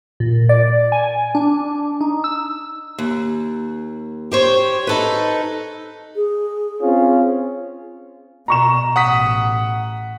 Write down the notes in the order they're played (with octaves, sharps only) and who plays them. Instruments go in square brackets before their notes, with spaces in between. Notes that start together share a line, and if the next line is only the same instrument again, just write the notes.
[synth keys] A#2
D5
G#5
D4
D#4
E6
[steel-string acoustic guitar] D#2
G4 C5 C#5
D#4 A4 B4
[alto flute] G#4
[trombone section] C4 C#4 F4
[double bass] B2 [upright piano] A#5 C#6 E7
[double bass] A1 [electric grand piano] F#5 D#6 B6